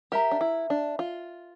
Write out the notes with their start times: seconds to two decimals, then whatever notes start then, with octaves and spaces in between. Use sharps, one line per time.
0.12 G4 A#4 E5 A#5
0.31 D4
0.41 E4
0.70 D4
0.99 F4